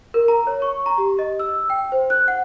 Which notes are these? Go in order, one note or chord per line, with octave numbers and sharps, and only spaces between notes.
A#4
A#5
C#5
C#6
A#5
G4
D#5
E6
G5
C5
F#6
F#5